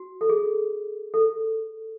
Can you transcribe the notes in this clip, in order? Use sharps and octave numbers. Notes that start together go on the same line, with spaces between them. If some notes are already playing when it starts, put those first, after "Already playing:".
Already playing: F#4
A4
G#4
A4